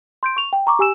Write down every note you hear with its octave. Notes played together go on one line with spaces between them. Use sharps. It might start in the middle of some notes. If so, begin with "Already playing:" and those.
C6 G6 D7
C#6 F7
G5
A#5 C#6 D6
G4 G#5 E6 E7